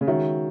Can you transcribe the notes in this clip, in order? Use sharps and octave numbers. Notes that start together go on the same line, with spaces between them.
C#3
D#3 G#3 C#4 F#4 C#5 E5